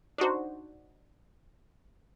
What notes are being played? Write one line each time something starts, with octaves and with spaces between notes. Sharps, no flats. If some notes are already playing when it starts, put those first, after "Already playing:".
D4 D#4 F#4 C5